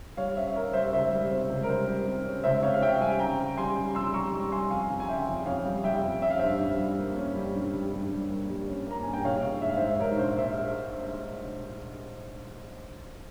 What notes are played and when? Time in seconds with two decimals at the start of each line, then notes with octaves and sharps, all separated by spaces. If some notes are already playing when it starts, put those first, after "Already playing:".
0.17 G3 C#5 F5
0.36 C#4 C5 E5
0.48 E5
0.55 C#4 A#4 C#5
0.73 G3 C5 E5
0.93 C#2 C5 E5
1.11 G3
1.31 C3 C5
1.50 C#2
1.63 A#4
1.68 G3 C5
1.87 G3
2.06 C3
2.25 C#4
2.44 C#2 C5 E5
2.63 C3 C#5 F5
2.74 F5
2.82 C#4 E5 G5
3.00 G3 F5 G#5
3.19 C#3 G5 A#5
3.39 C#3
3.57 G3 G#5 C6
3.77 G3
3.95 F2 C6 E6
4.14 G3 A#5 C#6
4.32 G3
4.52 G3 G#5 C6
4.70 F2 F5 G#5
4.90 F2
5.00 G#5
5.08 C#3 E5 G5
5.28 F2
5.46 F2 C#5 F5
5.65 G3
5.84 G3 E5 G5
6.03 F2
6.22 C#4 E5
6.30 F5
6.39 G2 C5 E5
6.60 G2
6.79 G3
6.98 A#3
7.16 C#4
7.35 G3
7.54 G2
7.73 G3
7.92 G2
8.11 G3
8.30 A#3
8.49 G3
8.67 C#4
8.87 A#3 A#5
9.03 G2 G#5
9.13 G5
9.24 A#1 C#5 F5
9.43 A#1
9.62 G#2 E5
9.69 F5
9.77 G#2 C5 E5
10.00 G#2 A#4 C#5
10.18 A#1 C5
10.37 C5 E5